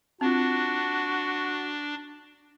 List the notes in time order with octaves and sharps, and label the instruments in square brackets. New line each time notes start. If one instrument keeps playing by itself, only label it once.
[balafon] C4 F4 [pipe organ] D4 [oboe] F#4